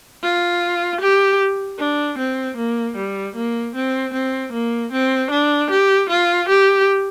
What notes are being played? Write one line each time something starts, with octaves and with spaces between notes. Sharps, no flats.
F4
G4
D4
C4
A#3
G3
A#3
C4
C4
A#3
C4
D4
G4
F4
G4